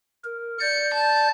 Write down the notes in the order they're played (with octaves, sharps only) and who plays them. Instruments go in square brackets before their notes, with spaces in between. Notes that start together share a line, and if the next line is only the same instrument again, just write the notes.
[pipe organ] A#4
[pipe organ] D5 G6 [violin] C#7
[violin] A5